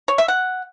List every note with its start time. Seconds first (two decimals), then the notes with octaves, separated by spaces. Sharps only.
0.08 C#5
0.18 E5
0.28 F#5